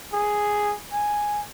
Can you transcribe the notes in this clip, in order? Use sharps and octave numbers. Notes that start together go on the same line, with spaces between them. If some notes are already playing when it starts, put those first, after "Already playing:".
G#4
G#5